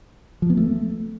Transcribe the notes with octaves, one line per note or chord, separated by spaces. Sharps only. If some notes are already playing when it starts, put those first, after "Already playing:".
F3
B3
A3